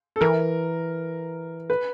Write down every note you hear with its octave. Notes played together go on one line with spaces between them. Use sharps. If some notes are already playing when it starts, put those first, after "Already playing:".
A4
E3 A#4
B4